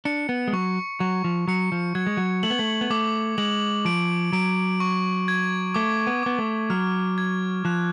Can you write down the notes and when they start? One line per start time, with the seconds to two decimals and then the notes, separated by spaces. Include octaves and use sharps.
0.05 D4 C#7
0.29 B3
0.48 G#3
0.53 F#3 C#6
1.00 F#3 C#6
1.24 F3
1.48 F#3 C#7
1.72 F3
1.95 F#3 G#6
2.07 G#3
2.17 F#3
2.43 A3 F#7
2.50 B3
2.59 A3
2.81 B3
2.90 A3 D6
3.38 G#3 F#7
3.85 F3 D7
4.33 F#3 D7
4.80 C#6
5.28 G#6
5.74 A3 D6
6.07 B3
6.23 B3 D6
6.39 A3
6.70 F#3 F6
7.18 G#6
7.65 F3 F#6